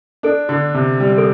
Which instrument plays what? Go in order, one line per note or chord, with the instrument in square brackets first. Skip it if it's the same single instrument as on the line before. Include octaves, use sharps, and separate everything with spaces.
[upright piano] D4 [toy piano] A4
[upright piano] D3
C3
G3
[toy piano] A4